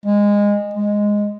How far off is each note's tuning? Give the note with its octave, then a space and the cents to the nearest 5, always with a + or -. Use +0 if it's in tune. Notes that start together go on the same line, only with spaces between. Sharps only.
G#3 -20
G#3 -5